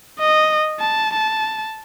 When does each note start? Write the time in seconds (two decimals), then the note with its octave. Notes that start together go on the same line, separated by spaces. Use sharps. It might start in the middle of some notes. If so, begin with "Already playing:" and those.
0.19 D#5
0.80 A5
1.13 A5